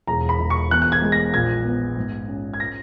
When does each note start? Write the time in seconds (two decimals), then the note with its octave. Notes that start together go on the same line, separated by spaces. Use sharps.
0.07 E1 A#5
0.29 B5
0.39 E1
0.50 C#6
0.71 E2 F#6
0.82 F#6
0.92 G#6
1.02 G#3
1.12 A#6
1.34 A#1 G#6
1.65 B3
1.97 G#2
2.28 C#4
2.54 G#6
2.60 A#6